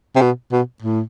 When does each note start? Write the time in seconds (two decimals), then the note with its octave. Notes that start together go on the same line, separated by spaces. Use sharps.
0.16 C3
0.21 B2
0.52 B2
0.82 A2